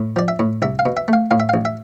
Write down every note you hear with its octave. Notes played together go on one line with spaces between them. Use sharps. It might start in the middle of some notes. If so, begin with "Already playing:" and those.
Already playing: A2
F3 D5
E5
A2
C2 E5
F5
B2
E5
A3 F5
A2 F5
E5
A1 F5
E5